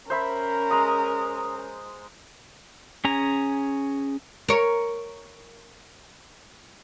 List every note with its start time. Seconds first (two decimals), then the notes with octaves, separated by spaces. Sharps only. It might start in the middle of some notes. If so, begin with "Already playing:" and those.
0.10 C#4 A#4 C5 E5 B5
0.71 G#3 A#5 D#6
3.05 C#4 G#4 A#5
4.48 A#4 C#5